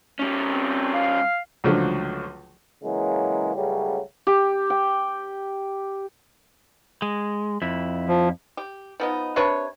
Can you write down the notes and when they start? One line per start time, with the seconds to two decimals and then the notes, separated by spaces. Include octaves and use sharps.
0.19 G3 C#4
0.49 C4
0.93 F5
1.64 C#2 D3 F3 F#3 A3
2.83 C#3 E3 F#3 G#3 A#3
3.55 C#2 C#3 F#3 G3 A3
4.27 G4
4.70 G5
7.02 G#3
7.62 F2 E4
8.08 F3
8.57 G4
9.00 F3 B3 D#4
9.36 C3 D4 B4 C#5